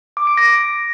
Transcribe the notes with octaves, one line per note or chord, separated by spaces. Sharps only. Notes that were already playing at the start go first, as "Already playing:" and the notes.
D6
D7
A#6